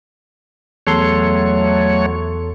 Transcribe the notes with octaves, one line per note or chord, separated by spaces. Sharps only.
E2 F#3 A3 A4 C#5 C6